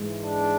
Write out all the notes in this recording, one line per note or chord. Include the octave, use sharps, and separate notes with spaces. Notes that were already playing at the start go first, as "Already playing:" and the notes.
Already playing: G#2 E3 G#3
D4